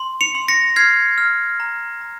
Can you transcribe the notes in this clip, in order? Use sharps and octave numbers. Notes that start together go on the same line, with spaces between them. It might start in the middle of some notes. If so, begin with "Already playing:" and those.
Already playing: C6
C#7 F7
C6
A#6 C#7
F6 G#6 C7
F6
A#5
A#5